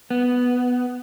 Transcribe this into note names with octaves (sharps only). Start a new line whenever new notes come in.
B3